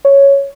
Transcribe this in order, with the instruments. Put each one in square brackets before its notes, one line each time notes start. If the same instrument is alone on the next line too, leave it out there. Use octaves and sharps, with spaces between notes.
[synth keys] C#5